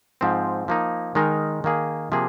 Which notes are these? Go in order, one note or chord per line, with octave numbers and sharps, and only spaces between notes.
G#2 F3 C4
F3 A#3 D#4
D#3 G#3 D#4 A#4
D#3 A#3 G#4
C3 F3 A#3 G#4